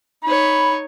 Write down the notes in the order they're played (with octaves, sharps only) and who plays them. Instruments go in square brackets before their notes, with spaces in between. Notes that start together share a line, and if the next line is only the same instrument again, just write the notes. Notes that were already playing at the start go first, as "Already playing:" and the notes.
[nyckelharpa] D#4 C#5 [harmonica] B5